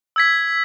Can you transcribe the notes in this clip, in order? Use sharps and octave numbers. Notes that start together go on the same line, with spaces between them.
E6 G#6 B6